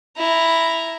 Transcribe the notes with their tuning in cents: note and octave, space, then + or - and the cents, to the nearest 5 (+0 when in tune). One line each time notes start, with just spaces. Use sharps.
E4 +0 A#5 +0